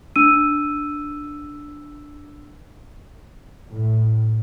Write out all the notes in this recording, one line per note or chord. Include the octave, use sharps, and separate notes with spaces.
D4 E6 D#7
A2